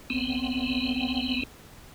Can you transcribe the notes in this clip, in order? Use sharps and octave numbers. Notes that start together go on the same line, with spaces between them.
F#1 C2 B3 C4